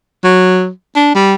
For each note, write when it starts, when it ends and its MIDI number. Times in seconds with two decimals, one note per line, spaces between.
0.24 0.69 54
0.95 1.11 62
1.15 1.35 55